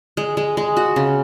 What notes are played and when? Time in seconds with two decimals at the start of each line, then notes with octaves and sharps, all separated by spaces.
0.17 G#3
0.37 G#3
0.57 G#3
0.77 F#4
0.96 C#3